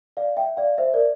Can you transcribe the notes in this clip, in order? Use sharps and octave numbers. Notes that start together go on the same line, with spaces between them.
D5 F5
E5 G5
D5 F5
C5 E5
A#4 D5